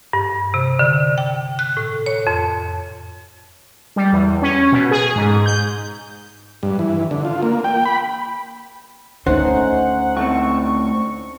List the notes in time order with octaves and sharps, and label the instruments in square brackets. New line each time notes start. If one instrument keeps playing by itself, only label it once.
[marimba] G2
C3
D3
G5
F#6
A2
C#5
F2
[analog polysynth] G3
E2
C#4
B2
G#4
G#2
G6
[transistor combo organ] G2
E3
D3
F4
A#3
G5
B5
[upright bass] D2 [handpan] C#4 D#4 [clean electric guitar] C5 [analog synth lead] F#5
[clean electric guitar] A2 A3 C4 [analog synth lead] C#6